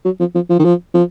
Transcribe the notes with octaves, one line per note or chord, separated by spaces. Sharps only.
F#3
F3
F3
F3
D#3
F3
F3